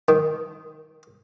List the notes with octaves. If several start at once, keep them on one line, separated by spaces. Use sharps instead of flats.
D#3